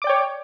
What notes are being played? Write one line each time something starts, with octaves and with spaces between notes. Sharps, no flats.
C#5 D5 G5 D6